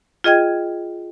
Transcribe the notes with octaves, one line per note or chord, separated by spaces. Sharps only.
F4 G#4 D#5 G5 G#6